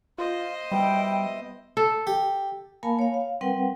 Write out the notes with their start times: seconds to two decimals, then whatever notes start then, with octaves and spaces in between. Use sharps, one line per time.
0.18 F4 C5 D#5
0.72 B2 G3 E4 G5
1.77 A4
2.07 G4
2.83 A#3 A#4 F5 G#5 A5 B5
2.99 C#5 F5
3.14 F5
3.41 G3 C4 A#4 B4 F#5 G5